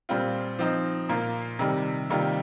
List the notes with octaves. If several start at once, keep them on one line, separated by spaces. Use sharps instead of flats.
A#2 G3 C4 F4
F3 C4 D#4
A#2 A#3 F4
C3 D#3 G3
C3 D#3 G3 A#3 F4